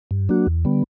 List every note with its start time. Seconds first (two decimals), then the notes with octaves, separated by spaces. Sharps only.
0.11 G2
0.29 F#3 A#3 D4 F#4
0.47 E2
0.65 D3 G3 B3